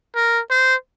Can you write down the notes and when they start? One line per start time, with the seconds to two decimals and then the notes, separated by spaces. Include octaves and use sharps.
0.16 A#4
0.50 C5